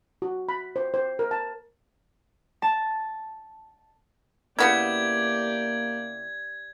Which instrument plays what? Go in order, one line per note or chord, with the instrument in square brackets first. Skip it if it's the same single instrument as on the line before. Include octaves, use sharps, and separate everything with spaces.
[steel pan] F#4
B5
C5
C5
A#4
A5
[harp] A5
[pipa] C#3 B3 E4 [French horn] A#3 [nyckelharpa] G4 D5 [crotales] G#6